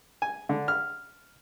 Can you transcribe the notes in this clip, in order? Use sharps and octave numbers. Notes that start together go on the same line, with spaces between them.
G#5
D3
F6